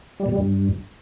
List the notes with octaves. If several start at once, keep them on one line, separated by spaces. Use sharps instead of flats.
G3
B2
G3
G2